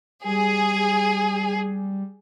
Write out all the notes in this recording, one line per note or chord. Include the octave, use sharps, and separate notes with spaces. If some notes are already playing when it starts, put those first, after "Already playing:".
G3 G#4